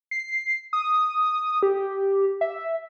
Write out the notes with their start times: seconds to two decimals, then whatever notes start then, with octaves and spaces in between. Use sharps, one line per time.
0.11 C7
0.73 D#6
1.63 G4
2.41 E5